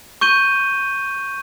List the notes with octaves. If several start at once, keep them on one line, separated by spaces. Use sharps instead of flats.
C#6 G6 D#7 G7